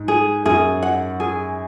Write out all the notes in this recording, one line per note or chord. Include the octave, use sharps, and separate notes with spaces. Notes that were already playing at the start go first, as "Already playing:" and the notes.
Already playing: G#2
G#4
F#2 G#4
F#5
G#4